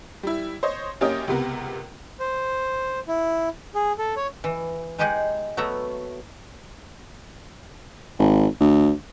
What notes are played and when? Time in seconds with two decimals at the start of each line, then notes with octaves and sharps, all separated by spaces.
0.23 G3 E4
0.63 C5 C#5 D#5
1.01 F#2 A#3 C#4 G4 D#5 D#6
1.28 C#2 C3 B3 A#4
2.20 C5
3.08 E4
3.75 G#4
3.98 A4
4.17 C#5
4.44 E3
4.98 G#3 D#4 G4 G#4 D#5 F#5
5.57 F#3 A3 B3 E5 A#5
8.19 G#1
8.60 D2